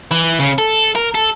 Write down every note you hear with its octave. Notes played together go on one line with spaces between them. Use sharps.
E3
C#3
A4
A#4
A4